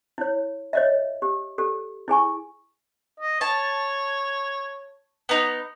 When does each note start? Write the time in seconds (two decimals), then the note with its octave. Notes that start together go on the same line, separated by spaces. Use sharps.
0.18 E4 C#5
0.73 C#5 D#5 E5
1.22 G4
1.58 G4 A4
2.08 E4 G#4 G#5 C#6
3.20 D#5
3.41 C#5 A5
5.29 B3 D#4